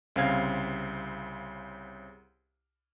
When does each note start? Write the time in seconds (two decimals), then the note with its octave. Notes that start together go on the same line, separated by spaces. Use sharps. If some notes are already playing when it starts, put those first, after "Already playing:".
0.16 C2 C#3 C4 F5 G#6